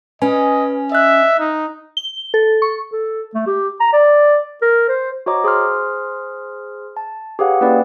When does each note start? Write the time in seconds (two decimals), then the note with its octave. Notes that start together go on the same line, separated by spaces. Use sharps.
0.22 C#4 B4 D#5 G#5
0.92 D#5 E5 F#6
1.39 D#4
1.97 G7
2.34 A4
2.62 C#6
2.92 A4
3.34 A3
3.47 G4
3.80 A#5
3.93 D5
4.62 A#4
4.89 C5
5.26 F#4 C5 C#5 D#5 A#5 D6
5.44 G#4 C5 C6 F6
6.97 A5
7.39 G4 G#4 B4 C#5 F5 F#5
7.61 A#3 C#4 E4 B4 D5 G5